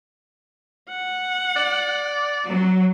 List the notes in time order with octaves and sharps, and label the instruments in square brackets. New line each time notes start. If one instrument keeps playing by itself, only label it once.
[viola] F#5
[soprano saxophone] D5
[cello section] F#3